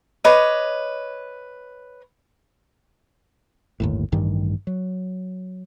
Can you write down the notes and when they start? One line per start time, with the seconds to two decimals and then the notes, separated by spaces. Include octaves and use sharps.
0.24 B4 C#5 D#5 D6
3.80 G1 D#2 A2
4.12 A1 G2 D#3 G3
4.67 F#3